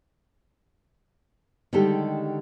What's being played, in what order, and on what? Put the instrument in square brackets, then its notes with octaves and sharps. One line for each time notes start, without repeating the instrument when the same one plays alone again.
[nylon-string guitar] D3 D#3 G3 G#3 G4 A4